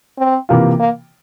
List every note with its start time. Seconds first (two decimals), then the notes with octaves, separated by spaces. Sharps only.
0.18 C4
0.49 C3 E3 A#3 F4
0.80 A#3